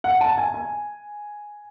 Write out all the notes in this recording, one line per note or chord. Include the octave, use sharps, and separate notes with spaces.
F#5
A5
G#5
G#5